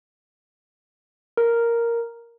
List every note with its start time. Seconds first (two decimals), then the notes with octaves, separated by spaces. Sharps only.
1.37 A#4